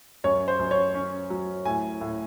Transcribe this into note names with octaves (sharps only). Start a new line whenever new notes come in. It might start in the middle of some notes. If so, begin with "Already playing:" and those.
F#2 C#5
C5
F#2
C#5
C#4
F#3
A2 G#5
A2